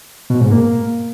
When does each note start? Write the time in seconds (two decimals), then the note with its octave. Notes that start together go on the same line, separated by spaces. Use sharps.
0.30 B2
0.41 G#2
0.51 A#3